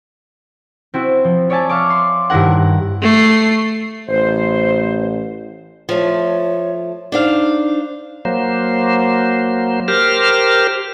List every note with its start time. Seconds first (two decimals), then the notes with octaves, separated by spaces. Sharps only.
0.94 C4 E4 F#4
1.24 F3
1.50 C#5 D5 E5 G#5 A5
1.69 E5 F5 C#6 D6
1.90 C6
2.30 G2 D#3 E4 A#4 F#5
3.02 A3 C7
4.09 A1 C5
5.89 F3 A3 C#5
7.12 D4 D#4 C5 F5
8.25 F#3 A#3 C5
9.88 G4 A#4 C5 F6